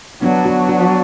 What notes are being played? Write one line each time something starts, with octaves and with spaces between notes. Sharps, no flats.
F#3 B3 D4
D4 F#4
D4 F#4